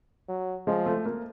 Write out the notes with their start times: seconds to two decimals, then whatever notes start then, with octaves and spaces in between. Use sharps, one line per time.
0.29 F#3
0.67 F3 G#3
0.86 A3
1.05 A#3